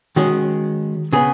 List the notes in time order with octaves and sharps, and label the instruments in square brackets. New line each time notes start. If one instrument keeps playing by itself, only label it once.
[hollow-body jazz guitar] D#3 G#3 C#4 F#4
C#3 B3 G#4